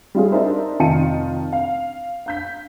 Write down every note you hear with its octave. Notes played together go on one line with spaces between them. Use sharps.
G3 F4 G#4
D4 D#4 A#4 C5 E5
F1 D#3 F4 A5 C#7 D#7
F5
F5 G6 B6